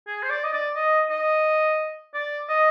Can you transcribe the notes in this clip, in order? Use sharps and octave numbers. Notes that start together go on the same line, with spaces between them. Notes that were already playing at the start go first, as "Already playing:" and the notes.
G#4
C5
D5
D#5
D5
D#5
D#5
D5
D#5